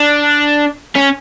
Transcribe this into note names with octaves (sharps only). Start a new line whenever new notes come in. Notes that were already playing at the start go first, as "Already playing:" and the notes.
Already playing: D4
C#4